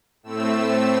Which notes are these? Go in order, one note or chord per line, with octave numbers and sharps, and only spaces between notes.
A2 A3 C4 E6